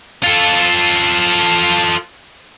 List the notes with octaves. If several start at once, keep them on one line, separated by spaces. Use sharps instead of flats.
F4 A4